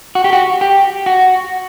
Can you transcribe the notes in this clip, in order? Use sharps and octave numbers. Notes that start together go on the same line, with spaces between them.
F#4
G4
F#4
G4
F#4